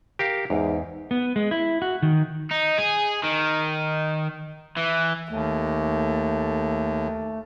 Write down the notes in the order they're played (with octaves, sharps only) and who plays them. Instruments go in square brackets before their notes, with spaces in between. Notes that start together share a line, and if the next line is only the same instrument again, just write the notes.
[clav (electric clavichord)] G4 A#4 F5
[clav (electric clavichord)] E2 [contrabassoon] G#2
[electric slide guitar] B3
G#3
E4
F#4
D#3
[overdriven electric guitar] D#4
G#4
D#3
E3
[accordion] D#2 [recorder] A3